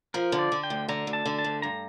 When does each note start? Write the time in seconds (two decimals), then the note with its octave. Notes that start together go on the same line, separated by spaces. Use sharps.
0.14 F3 A#4
0.32 D3
0.39 D5
0.52 D3
0.63 G5
0.70 D2
0.89 D3 A#5
1.07 D2
1.13 A5
1.26 D3
1.39 A5
1.44 D2
1.62 G2 A#5